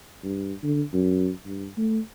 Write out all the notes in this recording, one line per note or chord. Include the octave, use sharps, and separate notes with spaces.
G2
D3
F#2
G2
A3